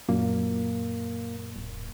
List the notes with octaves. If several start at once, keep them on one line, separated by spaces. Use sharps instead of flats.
F#2 A#2 A#3
D1